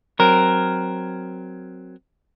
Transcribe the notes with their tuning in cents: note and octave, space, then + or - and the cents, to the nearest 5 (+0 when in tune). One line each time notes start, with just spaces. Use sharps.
F#3 +0 C4 +0 A#4 +0